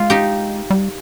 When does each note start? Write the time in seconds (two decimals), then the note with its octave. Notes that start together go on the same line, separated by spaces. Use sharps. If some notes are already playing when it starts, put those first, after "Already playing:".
Already playing: G#3 F4
0.10 D#4 G4
0.70 G3